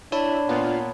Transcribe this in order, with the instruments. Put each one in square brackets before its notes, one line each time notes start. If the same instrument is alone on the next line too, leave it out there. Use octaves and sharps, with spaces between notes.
[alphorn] D4 [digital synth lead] E4 [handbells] C#5 A5 B5
[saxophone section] A#2 B3 [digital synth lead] F4